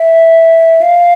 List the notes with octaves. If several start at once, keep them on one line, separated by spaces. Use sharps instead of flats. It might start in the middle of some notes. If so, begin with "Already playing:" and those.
Already playing: E5
F5